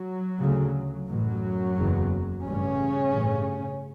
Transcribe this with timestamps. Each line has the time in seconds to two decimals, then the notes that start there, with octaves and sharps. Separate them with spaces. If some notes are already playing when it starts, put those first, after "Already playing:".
Already playing: F#3
0.41 D2 C#3
1.08 A1 F#2 A2 F#3
1.77 F#1 E2 C#3
2.43 A1 G2 C#3 C#4
3.12 A1 G2